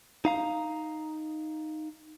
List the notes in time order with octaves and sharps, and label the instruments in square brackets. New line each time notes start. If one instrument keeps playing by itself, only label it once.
[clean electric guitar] D#4 F5 A#5